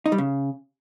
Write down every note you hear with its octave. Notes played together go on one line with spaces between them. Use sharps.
D#4
G3
C#3